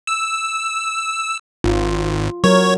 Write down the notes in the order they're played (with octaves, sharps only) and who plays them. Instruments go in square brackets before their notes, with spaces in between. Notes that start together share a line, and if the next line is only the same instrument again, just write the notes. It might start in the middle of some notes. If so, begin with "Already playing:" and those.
[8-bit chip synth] E6
[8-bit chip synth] G#1 [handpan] F4
[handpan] F#3 A#4 [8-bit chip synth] C#5